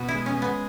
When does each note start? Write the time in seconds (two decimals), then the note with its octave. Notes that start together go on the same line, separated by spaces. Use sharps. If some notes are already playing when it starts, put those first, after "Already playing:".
Already playing: B2 F#4
0.08 E4
0.14 G#3
0.26 C#4
0.37 G#3
0.42 B3